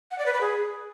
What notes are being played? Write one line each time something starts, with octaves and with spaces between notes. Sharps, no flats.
F#5
D5
B4
B5
G#4